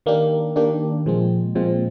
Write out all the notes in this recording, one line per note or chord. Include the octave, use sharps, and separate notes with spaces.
D#3 A#3 D4 G4
D#3 A#3 D4 G4
A#2 F3 G#3 C4
A#2 F3 G#3 C4